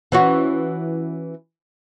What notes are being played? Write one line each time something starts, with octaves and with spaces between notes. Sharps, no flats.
E3 C#4 F#4